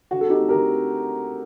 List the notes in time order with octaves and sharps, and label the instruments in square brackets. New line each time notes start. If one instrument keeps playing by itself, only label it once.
[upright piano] D3 F#4
A4
C4 D#4 G4
A3
G4 A#4
D3